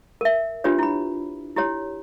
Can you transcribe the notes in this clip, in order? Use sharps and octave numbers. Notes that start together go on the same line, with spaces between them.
A#4 E5
D4 F4 G4 B4 C#5
E4 B5
E4 G4 C#5